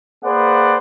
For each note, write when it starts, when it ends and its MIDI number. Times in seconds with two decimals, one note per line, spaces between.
0.25 0.77 58
0.25 0.77 68
0.25 0.77 71
0.25 0.77 72
0.25 0.77 74
0.25 0.77 78